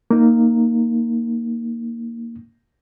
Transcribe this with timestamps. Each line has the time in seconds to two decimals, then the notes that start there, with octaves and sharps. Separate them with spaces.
0.11 A#3 D#4